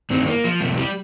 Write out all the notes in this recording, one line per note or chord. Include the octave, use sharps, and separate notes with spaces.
G2 D#3 C4
A#3
F3
F2 C3 G3
G3